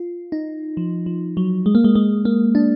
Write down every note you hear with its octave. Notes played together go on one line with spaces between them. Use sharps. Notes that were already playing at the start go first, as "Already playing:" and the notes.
Already playing: F4
D#4
F3
F3
F#3
G#3
A#3
G#3
G#3
A#3
D4